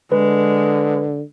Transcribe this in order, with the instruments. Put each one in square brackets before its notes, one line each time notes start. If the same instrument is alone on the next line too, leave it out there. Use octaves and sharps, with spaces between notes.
[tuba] D3 [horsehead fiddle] G#3 [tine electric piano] B4